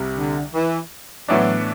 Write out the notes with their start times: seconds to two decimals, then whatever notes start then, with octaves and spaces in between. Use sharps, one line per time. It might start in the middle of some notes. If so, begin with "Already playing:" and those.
Already playing: C2 C3 G3
0.17 D3
0.54 E3
1.28 A2 E3 F#3 B3 D4